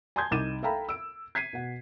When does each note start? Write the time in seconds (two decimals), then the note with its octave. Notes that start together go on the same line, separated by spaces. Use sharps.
0.16 G#5 A5 C6 D#6 G6 G#6
0.31 C2 D#4 D6 A6 D#7 E7
0.63 A4 E5 F5 G5 A#5 B5
0.89 E6 D7
1.35 G#6 B6 C7 D#7
1.53 B2 F#5